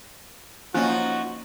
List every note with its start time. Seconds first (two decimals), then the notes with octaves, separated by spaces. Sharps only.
0.74 F3 A#3 C#4 D#4 F4 F#4 G#5